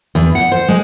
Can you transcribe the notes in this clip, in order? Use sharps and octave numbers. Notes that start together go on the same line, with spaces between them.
E2
F#5
C5
G#3